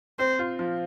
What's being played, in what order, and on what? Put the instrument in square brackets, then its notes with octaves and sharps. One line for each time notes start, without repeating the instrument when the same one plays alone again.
[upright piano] C4 [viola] C5
[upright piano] F4
F3